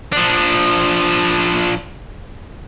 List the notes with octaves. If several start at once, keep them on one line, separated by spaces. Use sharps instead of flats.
F3 D4